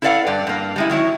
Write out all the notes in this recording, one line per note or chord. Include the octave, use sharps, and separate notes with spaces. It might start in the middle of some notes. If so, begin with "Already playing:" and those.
E4 A4 B4 D5 F5 F#5
G2 D5
G2 A#3
G3 G#3 E4
D#3 F#3 E4 C#5